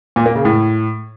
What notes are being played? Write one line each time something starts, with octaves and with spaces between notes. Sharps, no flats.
A#2
A#3
C#3
A2